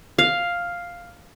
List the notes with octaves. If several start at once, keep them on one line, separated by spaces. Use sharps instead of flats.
F5